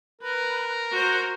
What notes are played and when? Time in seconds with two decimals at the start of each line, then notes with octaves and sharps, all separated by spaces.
0.22 A#4 B4
0.91 F#4 C5